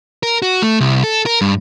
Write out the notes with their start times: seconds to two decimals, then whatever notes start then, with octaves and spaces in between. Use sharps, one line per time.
0.23 A#4
0.42 F#4
0.62 A3
0.80 C2
1.04 A4
1.26 A#4
1.41 G2